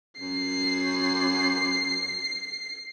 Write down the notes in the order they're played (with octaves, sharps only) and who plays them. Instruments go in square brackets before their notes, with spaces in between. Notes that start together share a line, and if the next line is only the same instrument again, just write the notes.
[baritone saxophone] F#2 [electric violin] C7